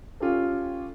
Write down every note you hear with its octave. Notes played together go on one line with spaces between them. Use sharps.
C#4 F4 G4 A4